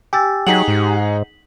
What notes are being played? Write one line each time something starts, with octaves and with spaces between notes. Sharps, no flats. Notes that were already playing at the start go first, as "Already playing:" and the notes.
G4 G#5 E6 A6
F#3 D#4 G#4 F#5 B6 F#7
G#2